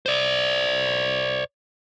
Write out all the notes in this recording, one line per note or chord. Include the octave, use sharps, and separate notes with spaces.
C5 D5